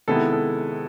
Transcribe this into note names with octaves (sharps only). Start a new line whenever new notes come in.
C3 D#3 G#3 B3 E4 A4
A4